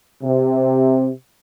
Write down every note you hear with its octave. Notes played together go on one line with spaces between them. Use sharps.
C3